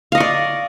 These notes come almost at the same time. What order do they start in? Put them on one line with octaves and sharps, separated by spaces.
F5 D#5 C#6 D5